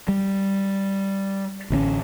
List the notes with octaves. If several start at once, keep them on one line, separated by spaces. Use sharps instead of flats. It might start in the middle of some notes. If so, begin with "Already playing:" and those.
G3
A1 D3 B3 C#4